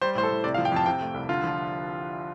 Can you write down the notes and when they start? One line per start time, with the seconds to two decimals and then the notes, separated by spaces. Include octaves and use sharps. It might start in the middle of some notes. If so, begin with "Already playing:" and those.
0.02 G3 C5
0.15 A2 C5
0.23 A4
0.30 A2
0.44 C3 D5
0.54 F5
0.58 F3
0.65 G5
0.72 F2 A5
0.86 C3 G5
1.01 A3
1.14 C2
1.29 D3 F4
1.44 F3